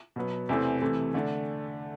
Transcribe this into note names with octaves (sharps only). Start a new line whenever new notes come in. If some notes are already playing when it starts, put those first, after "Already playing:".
B2 F#3 B3
E2 C3 E3 A3 C4
C3 E3 A3
D3 A3 D4